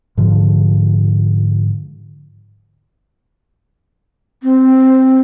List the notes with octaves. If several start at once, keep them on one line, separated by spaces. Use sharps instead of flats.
G#2 D3 F3
C4